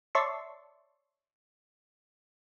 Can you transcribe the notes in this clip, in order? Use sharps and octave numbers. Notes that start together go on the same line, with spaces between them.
C#5 D5 E5 A5 C6 C#6